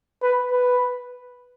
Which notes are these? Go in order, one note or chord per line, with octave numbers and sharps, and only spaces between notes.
B4
B4